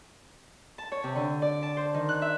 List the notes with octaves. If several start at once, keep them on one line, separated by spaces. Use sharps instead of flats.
A5
C#5
C3
D3
D5
A5
C5
D#3
F#6
E5